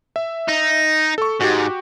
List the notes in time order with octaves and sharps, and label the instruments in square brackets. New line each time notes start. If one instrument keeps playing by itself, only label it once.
[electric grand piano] E5
[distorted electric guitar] D#4
[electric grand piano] A4 C#6
[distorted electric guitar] G#2 [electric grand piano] F#4 G4